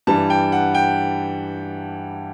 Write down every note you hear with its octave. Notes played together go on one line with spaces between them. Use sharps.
G2 E3 G3 A5
G5
F#5
G5